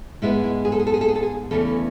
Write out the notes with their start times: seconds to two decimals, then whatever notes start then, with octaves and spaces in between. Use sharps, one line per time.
0.22 G#2 G#3 B3 E4
0.44 E4
0.65 G#4
0.72 A4
0.80 G#4
0.87 A4
0.94 G#4
1.01 A4
1.08 G#4
1.16 A4
1.23 G#4
1.51 E2 C#3 E3 A3 C#4 A4
1.67 A4